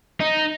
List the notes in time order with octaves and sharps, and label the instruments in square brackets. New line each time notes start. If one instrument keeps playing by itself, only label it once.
[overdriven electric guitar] D#4